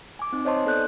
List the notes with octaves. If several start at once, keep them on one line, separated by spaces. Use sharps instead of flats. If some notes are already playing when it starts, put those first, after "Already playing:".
G#5 D6
C4 D#4
C5 C#5 D#5 G#5 A5 C6
B3 D#4 A4 D5 F#6 G6